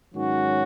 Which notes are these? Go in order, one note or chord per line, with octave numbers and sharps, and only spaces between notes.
G#2 D#3 F#3 C#4 F#4